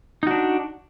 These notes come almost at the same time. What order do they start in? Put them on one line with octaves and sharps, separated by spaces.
D#4 F#4 D4